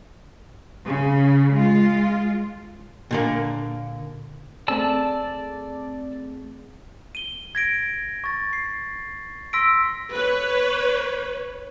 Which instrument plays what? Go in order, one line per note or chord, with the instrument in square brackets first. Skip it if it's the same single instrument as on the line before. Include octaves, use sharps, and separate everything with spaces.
[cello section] C#3
G#3 F4
[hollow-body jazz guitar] A#2 D3 A#3
[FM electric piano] A3 C4 G#4 [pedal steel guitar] D5 A5 E6
[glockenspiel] D#7 G7
G#6 A#6 D7
C#6 A6
C7
C6 E6 A#6 B6 D7
[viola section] B4 C#5